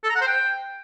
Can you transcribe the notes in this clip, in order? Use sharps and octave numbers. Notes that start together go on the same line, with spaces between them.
A4
A#5
F#5
C5
G5